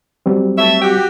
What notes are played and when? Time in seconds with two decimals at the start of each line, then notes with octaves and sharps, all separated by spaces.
0.26 F#3 G3 C4
0.57 A3 C#5 E5
0.82 F#4 G4